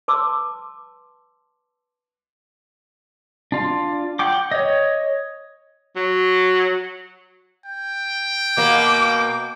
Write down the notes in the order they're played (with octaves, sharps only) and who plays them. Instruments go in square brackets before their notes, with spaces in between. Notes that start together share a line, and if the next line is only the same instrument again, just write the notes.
[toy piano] B4 A5 C6 D6 E6
[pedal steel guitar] D4 F4
F#5 G5 D6
C#5 D#5
[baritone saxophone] F#3
[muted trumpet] G5
[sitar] B2 A#3 [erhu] D6